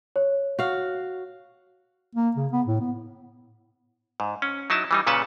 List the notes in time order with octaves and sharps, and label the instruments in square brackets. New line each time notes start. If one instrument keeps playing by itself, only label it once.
[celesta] C#5
[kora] F#4 F5
[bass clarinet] A#3
C#3
B3
A2
B3
[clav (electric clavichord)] G#2
C#4
F#3 D#4 E4 A5
E3 G3 D#4
A#2 C#3 C#4 B4 F#5 A5